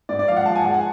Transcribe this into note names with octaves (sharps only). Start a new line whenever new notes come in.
G#2 D5
D5
F3 F5
F#5
F3 A5
G#5
G#3 F#5
G#5